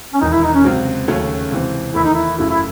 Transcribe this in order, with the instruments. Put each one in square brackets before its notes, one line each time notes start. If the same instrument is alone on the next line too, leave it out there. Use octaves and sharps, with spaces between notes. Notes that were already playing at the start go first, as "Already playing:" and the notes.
[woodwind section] C#4
[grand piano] E1 E2 D#3 [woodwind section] D#4
[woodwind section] E4
D#4
C#4
[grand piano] C#2 C3 F#3 C4
D#2 C#3 F#3 A3 C#4
C#2 C3 E3 C4
[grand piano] E2 D#3 A3 [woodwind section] E4
[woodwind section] D#4
E4
[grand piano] F#1 F#2 C#3 F#3 A3 [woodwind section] E4
[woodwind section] E4